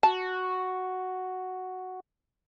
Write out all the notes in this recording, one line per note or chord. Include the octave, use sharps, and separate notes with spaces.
F#4 A5